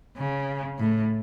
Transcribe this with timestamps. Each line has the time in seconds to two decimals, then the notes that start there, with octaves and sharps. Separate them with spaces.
0.17 C#3
0.79 A2